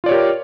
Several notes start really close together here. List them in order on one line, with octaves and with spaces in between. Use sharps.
F4 D5 C#5 G4 A#4